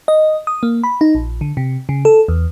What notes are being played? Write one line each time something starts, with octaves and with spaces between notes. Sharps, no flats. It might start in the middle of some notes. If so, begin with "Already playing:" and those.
D#5
D#6
A#3
B5
D#4
A#1
D3
C3
C#3
A4
E2